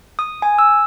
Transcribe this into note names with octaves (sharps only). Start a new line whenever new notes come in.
D#6
G#5
E6